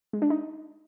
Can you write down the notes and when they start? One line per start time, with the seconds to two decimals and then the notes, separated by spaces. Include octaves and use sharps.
0.13 G#3
0.22 D4
0.30 D#4